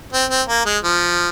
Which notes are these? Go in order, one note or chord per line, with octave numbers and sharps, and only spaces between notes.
C4
C4
A#3
G#3
F3